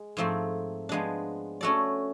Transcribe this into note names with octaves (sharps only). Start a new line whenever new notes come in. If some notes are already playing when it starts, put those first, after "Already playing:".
Already playing: G#3
G#2 F3 A3 C4
F3 G#3 B3 D4
A3 C#4 F#4 A4 D5